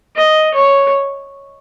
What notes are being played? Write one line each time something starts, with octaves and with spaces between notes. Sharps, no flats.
D#5
C#5